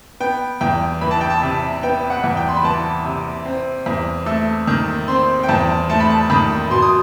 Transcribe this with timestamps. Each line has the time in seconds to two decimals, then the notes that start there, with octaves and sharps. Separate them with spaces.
0.20 B3 G5
0.61 E2 G5
1.01 E3 B5
1.11 A5
1.21 G5
1.30 A5
1.42 C3
1.83 B3 G5
2.10 F#5
2.24 E2
2.37 G5
2.49 C6
2.56 B5
2.64 E3 A5
3.05 C3
3.45 C4
3.86 E2
4.26 A3 E6
4.67 D#3
5.08 C4 C6
5.43 G5
5.48 E2 A5
5.89 A3 A5
6.00 B5
6.10 A5
6.30 D#3 B5
6.70 B2 C6
6.82 D#6